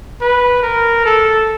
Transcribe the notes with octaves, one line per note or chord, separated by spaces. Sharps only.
B4
A#4
A4